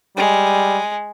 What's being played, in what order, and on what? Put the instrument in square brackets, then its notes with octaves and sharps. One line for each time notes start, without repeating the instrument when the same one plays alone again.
[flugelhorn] G3 [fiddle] G#3